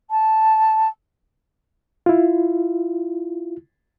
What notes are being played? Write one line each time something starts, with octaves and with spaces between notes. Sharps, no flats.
A5
E4 F4